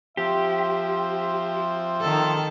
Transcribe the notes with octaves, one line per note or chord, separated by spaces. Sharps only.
F3 C4 G4 E5
D#3 A4